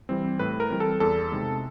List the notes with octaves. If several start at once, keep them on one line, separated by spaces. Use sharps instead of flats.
E3 G3 C4
A2 B4
A#4
E3 G3 C4
A4
E2 A4
C3 D#3 G#3